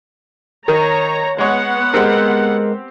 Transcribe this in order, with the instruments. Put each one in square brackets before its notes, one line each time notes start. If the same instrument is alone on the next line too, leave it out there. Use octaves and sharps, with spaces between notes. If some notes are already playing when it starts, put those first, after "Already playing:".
[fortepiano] D#3 [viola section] C#5 A#5
[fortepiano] G#3 C#5 [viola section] B3 F#5
[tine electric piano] G#3 A#4 [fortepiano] C4 G4